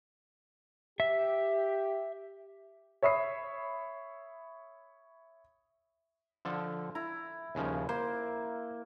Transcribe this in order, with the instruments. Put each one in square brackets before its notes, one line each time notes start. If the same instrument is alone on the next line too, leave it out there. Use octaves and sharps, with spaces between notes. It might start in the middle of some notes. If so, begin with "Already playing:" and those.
[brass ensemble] G4 [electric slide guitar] E5
[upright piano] C#5 E5 B5 D#6 C7
[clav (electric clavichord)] D3 F3 A4
[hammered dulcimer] E4 [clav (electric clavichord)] A#5
[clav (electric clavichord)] D#2 C#3 F3
[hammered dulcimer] A#3 [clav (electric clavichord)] C5